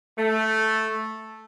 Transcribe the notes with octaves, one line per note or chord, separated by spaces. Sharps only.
A3